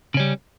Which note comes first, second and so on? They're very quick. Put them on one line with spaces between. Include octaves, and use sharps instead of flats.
C#3 C#4 G3